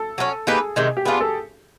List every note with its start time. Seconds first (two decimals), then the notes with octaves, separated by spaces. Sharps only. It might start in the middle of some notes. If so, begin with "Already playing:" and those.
Already playing: A4
0.18 F#3 A3 C#4
0.47 A#3 D#4 G4 G#4 B4
0.76 C3 D#3 G#3
0.97 G4
1.05 B3 D4 F4 G#4
1.21 A4